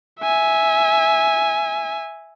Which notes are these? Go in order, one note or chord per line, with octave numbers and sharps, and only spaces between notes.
E5 G#5